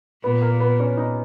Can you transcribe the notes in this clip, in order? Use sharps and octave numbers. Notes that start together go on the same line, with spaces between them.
A#2 B3
A#3
B3
C#4
D#4